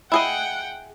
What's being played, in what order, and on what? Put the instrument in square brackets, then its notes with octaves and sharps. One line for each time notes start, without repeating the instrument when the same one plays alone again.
[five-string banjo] E4 G#4 D#5 [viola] F#5 G5